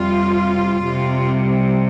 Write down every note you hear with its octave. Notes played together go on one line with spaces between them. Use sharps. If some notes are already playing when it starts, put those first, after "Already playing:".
Already playing: F2 C3 G3 F4
F2 C3 G3